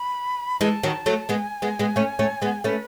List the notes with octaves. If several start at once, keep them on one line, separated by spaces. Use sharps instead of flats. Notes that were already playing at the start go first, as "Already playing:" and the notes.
Already playing: B5
E3 G#3 A5
D#3 F#3
F#3 A3
G#3 B3 G#5
G#3 B3
G#3 B3
A3 C#4
A3 C#4
G#3 B3
A3 C#4 B4